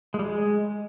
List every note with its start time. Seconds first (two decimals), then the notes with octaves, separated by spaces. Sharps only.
0.14 G#3
0.19 G3
0.24 G#3